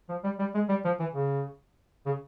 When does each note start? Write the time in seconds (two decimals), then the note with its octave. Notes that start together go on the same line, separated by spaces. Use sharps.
0.09 F3
0.24 G3
0.39 G3
0.54 G#3
0.69 G3
0.84 F3
0.99 E3
1.14 C#3
2.06 C#3